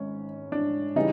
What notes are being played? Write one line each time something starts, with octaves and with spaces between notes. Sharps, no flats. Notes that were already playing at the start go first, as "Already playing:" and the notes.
Already playing: G#1 C#4
D4
C#3 E3 G3 D#4